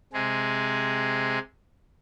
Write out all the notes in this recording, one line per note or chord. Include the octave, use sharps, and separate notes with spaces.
C3 G#3 G#4